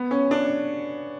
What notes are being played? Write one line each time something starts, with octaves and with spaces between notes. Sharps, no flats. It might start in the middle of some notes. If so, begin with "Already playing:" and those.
Already playing: B3
C#4
D4